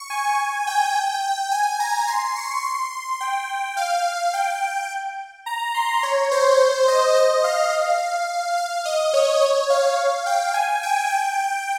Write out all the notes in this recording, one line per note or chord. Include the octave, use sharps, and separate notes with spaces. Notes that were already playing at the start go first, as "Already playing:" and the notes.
Already playing: C#6
G#5
G5
G#5
A#5
C6
C#6
C6
G5
F5
G5
A#5
C6
C#5
C5
D#5
D#5
F5
F5
D#5
C#5
C#5
F5
G5
G#5
G5
G5